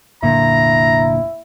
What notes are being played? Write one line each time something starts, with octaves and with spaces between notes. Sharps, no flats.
F1 A#2 D3 E4 A#5